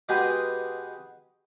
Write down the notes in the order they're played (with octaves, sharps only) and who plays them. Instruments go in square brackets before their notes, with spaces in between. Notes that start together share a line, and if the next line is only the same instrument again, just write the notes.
[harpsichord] B2 G#3 G4 G#4 B4 G5